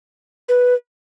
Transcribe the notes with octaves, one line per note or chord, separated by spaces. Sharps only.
B4